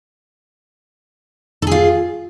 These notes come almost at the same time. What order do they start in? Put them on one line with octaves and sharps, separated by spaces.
A4 G#4 F4